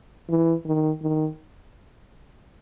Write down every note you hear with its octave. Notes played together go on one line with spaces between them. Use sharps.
E3
D#3
D#3